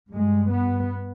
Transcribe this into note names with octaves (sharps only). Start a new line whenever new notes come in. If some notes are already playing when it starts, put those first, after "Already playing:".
G2 G#3
B3